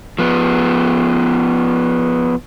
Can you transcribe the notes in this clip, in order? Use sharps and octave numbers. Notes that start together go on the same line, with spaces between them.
F3 B3